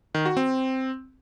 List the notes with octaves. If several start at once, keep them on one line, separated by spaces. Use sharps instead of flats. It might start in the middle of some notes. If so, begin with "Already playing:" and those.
D#3
F#4
C4